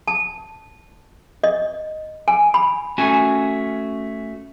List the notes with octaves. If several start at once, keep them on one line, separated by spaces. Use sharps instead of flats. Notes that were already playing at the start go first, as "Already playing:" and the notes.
A5
D#5
G#5
B5
A3 C#4 F#4 G#5